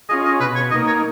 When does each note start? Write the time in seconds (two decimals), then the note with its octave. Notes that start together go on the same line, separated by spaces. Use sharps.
0.09 C#4 F4 G#4 D#5
0.25 D#5
0.40 B2 B4
0.55 C#5
0.71 A#3 D#4 D#5
0.87 C#5